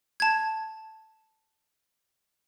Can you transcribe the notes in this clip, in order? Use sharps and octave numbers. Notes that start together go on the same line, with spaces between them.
A5 G#6